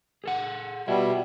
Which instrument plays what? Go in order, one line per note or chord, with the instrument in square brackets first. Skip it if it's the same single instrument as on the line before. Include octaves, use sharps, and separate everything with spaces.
[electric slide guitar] G#4 A4 F#5
[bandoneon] B2 G3 [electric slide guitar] F4 E5